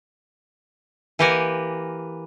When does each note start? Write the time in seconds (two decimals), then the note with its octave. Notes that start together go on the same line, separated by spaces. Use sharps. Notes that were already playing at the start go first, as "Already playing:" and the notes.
1.19 E3 A#3 G4 A#4 F#5 G#5